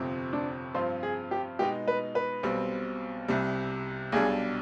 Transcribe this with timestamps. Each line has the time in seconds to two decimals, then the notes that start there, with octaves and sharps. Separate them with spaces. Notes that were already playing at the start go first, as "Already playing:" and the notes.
Already playing: G1 F2 C3 F3 C4
0.33 D4
0.74 G2 F3 C4 F4 C5
1.03 G#4
1.31 G4
1.59 B2 G#3 B3 D#4 G4
1.88 B4
2.15 B4
2.43 B1 B2 G3 C4
3.28 C2 C3 G3
4.12 B1 B2 G3 D4 G#4